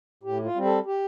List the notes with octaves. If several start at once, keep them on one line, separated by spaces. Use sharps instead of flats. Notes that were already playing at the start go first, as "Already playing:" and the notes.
A2 G4
F4
G3 C4
A4
G4